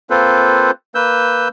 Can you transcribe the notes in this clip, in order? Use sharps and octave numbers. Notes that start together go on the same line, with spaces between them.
A#3 C4 F4 A4 B4 C5
A#3 B4 E6 G6